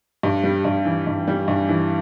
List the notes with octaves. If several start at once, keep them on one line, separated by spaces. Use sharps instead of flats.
G2
G3
G2
E3
G2
G3
G2
E3